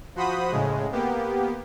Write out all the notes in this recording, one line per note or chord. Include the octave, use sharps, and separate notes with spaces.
F3 F#4 C5 B5 D#6
A2 C#3 G#3
A#3 B3 G4